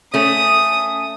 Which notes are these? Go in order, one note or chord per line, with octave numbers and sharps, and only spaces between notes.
A3 C#4 D#6